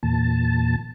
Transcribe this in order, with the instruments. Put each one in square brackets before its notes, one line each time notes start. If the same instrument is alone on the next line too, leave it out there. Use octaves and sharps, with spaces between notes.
[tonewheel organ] E2 A#2 A5